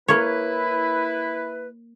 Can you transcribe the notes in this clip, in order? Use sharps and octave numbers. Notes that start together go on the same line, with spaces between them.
A#3 E4 B4 C#5